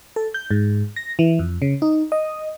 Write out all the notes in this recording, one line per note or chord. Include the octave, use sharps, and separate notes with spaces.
A4
G6
G#2
A#6
E3
F2
C#3
D#4
D#5